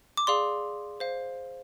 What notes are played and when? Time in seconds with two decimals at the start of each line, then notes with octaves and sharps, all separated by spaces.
0.17 D6
0.27 G#4 D5 F5 C6
1.00 C5 F5